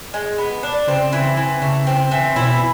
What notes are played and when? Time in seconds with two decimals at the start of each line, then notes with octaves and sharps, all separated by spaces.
0.14 G#3
0.38 B3
0.63 D4
0.88 C#3 C4
1.13 E3
1.37 E3
1.62 C#3 A3
1.87 C4
2.11 E3
2.36 B2 E4